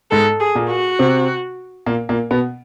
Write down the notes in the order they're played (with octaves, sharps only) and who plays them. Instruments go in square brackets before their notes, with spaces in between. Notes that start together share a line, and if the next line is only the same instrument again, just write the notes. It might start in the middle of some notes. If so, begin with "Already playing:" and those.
[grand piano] G#2 G#3 [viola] A4
[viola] G#4
[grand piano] A#2 A#3
[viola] F#4
[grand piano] C3 C4
A#2 A#3
A#2 A#3
B2 B3